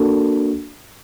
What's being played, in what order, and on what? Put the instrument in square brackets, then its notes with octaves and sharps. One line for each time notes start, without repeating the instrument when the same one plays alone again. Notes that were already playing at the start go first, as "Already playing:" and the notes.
Already playing: [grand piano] A#3 D4 F#4 A4